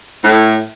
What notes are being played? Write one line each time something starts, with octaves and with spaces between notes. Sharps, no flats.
A2